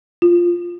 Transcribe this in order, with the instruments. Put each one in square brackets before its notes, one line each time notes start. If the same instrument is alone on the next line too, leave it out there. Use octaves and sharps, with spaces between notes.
[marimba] F4